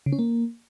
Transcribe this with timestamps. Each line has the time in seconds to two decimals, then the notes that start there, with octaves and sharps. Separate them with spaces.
0.06 C#3
0.12 C#4
0.19 A#3